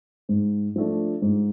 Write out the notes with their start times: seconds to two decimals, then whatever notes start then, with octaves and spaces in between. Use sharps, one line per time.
0.29 G#2
0.76 F3 A3 D4
1.22 G#2